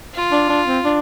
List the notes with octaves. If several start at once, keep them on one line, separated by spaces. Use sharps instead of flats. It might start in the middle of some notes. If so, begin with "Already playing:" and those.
F4
D4
D4
C4
D4